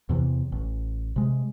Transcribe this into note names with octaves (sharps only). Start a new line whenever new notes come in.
E2 C3 E3
A1
C3 G#3